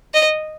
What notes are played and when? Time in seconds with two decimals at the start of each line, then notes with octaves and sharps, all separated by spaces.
0.14 D#5